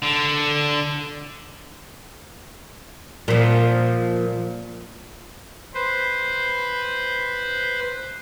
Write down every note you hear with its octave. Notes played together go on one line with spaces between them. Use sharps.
D3
A#2 F3
B4 C5